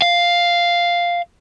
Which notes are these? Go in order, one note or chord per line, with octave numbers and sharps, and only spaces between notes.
F5